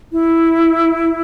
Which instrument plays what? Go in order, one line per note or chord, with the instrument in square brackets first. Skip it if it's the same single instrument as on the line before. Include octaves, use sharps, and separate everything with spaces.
[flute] E4